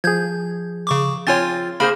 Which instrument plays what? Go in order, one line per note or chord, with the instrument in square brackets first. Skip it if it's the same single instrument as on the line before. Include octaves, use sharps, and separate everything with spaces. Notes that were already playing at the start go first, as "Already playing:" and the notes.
[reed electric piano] F3 G#4 [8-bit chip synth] G6 G#6
[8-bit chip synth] C#3 C#6 D6
[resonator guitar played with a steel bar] C4 F4 [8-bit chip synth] C#5 G#5 A6
[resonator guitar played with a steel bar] A#3 G#4 C5 [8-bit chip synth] B5